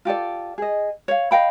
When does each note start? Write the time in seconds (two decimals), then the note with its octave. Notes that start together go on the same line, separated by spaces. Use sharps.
0.05 F4 G4 A4 D5
0.58 G#4 D#5
1.08 C#5 F5
1.31 D#5 F5 G5 B5